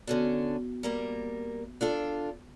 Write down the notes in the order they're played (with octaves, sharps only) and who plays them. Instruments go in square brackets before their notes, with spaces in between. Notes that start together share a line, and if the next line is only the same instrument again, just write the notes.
[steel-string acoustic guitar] D3 C#4 D4 [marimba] B3 F#4
[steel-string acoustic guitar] G3 A#3 A#4
D4 F4 A4